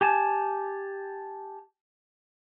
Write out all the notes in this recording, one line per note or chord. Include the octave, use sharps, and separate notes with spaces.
G4 G#5 A5